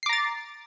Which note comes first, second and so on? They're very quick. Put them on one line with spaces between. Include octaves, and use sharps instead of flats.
C7 D6 A#5 A6